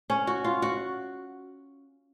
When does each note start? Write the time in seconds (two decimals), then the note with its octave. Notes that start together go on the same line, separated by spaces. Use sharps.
0.10 C#4
0.27 F#4
0.44 F4
0.62 F#4